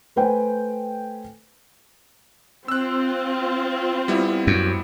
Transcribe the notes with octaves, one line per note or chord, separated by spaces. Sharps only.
A3 B4 C5 G5 G#5
C4 F4 E6 F#6
G3 B3 E4
F#2